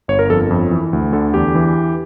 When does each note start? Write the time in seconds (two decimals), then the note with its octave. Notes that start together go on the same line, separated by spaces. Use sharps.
0.08 G1 C#5
0.19 A#4
0.30 F2 A4
0.51 F2
0.71 E3
0.93 D2
1.13 D3 A4
1.34 E2 G4
1.55 E3